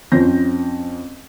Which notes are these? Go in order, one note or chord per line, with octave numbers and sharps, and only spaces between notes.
F2 C4 C#4 G6 A#6